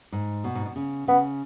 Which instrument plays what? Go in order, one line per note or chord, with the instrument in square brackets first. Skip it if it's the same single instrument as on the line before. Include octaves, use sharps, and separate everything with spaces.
[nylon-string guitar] G#2
B2
G#2
B2
C#3
[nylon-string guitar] C#3 [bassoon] B3